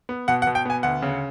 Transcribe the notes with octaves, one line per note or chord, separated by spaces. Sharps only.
B3
B2 F#5
F#5
B2
G5
B3 G#5
D2 F#5
C#3